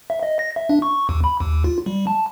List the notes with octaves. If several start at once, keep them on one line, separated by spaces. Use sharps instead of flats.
E5
D#5
A#6
E5
D4
C#6
D#2
B5
D#2
F4
G3
A5